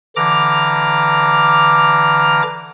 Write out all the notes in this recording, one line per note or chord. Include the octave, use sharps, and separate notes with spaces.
D3 E3 A#5 D6 F6